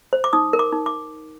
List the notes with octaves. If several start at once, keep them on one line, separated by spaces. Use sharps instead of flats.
C5
D6
D#4 D#6
A#4
D6
D#4
D6